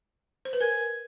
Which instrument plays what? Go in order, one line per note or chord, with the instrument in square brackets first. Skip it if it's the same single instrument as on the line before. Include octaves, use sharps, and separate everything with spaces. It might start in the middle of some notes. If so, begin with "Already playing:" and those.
[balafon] C5
B4
[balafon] A#4 [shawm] G#5